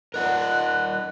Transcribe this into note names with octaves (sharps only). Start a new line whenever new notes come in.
A#4 D#5 F#5 F#6